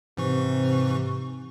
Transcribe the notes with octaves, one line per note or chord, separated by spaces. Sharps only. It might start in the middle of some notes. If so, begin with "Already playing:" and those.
G#2 C3 E3 C#6